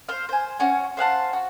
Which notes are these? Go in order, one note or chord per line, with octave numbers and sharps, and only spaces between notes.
C5 F5
C5 G#5
C#4 F#4 G#5
C5 F5 F#5 A5
F#4